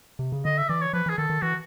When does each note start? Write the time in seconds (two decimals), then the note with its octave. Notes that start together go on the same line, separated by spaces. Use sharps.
0.19 C3
0.32 C#3
0.45 D3 D#5
0.58 E5
0.69 E3 D5
0.82 C#5
0.93 F3 B4
1.06 E3
1.10 G#4
1.18 D#3 A4
1.30 D#3
1.42 E3 F#4